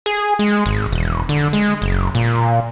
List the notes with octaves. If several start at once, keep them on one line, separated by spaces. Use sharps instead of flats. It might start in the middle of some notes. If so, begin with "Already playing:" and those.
G#4
G#3
G#1
E1
D3
G#3
F#1
A#2